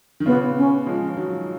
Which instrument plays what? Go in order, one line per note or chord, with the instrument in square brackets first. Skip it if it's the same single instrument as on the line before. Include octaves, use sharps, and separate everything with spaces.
[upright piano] D#3
[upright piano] A#2 C#3 [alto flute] B3
[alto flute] C#4
[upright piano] F3 G#3
D#3 F#3